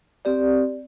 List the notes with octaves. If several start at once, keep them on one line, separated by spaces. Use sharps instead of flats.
C4 G4 D5